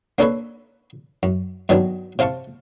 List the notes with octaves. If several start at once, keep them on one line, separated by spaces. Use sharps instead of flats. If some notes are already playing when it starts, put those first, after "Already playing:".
A#3 C#4 D4 A4 B4 C#5
F#2
G2 D#3 F#3 B3 D4
C3 C5 F5 A5 C#6